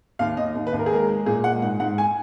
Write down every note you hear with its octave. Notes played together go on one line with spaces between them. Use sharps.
D#2 F5
D#2 D#5
D#2
B4
D#2
A#4
G#4
G#3 A#4
G#3
A#2 G#4
G#3 F#5
G#2 F#5
G#2 F#5
G#5